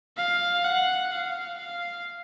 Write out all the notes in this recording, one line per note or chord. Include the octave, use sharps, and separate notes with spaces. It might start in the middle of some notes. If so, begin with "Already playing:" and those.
F5
F#5
F5
F5